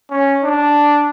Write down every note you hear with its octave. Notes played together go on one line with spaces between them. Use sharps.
C#4
D4